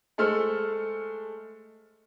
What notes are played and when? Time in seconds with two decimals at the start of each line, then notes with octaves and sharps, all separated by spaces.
0.18 G#3 A3 A4 C5 F6